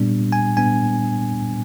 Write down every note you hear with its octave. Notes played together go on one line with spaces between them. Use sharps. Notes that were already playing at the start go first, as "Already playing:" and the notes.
Already playing: A#2 G3 B3 D4
G#5
A#2 G3 B3 D4 G#5